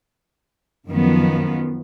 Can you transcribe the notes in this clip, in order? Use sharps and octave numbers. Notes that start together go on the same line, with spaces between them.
F#2 D#3 F3 B3